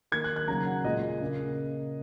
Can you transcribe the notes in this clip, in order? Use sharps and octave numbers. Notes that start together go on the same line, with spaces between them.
D#3 A#3 G#6
F#6
F#6
C#3 F#3 A#3 A#5
F#5
A#2 G#3 D#5
C#3 A#3